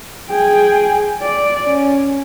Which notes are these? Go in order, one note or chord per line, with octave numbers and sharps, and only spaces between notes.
G#4 G5
D5
C#4